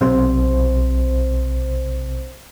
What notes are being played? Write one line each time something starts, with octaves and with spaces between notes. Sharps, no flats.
B1 C3 C5